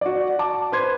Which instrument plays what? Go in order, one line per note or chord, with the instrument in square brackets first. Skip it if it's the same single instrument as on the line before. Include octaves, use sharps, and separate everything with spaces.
[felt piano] F#4 D5
A5 D6
B4 C5 C6 G#6